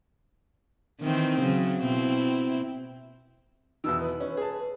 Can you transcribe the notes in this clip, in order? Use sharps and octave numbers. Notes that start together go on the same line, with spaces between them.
D#3 E3 C4
C#3 F#3
B2 C4 E4
E2 B2 D#3 E6
B4
C#4
G#4 A5